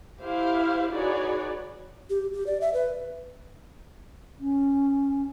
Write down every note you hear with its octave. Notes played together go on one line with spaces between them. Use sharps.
E4 G4 C5 F5
D#4 F#4 G#4 B4 C#5 D5
G4
G4
D5
E5
B4
C#4